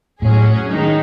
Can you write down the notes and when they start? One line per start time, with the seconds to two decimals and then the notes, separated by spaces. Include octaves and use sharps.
0.22 A2 F#3 C#4 G#4
0.68 D#3 G#3 D#4